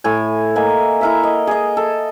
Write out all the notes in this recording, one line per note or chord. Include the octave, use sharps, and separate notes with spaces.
A2 G#5
A#3 D#5 E5 G#5
E4 A#4 E5
D#5
G#4 D#5
A4